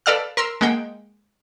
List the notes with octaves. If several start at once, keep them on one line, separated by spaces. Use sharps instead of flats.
A4 B4 D5 F5 E6 F6
A#4 C6 E6
G#3 A#3 F#5 G5